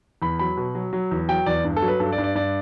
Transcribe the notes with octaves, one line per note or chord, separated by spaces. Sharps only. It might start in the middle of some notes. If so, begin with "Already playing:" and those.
E2 B5
F#3 B5
B2
F#3
F#3
E2
F#3 G5
E2 D5
G2
A4
F#3
B4
G2 A4
D5
G2
D5
G2 D5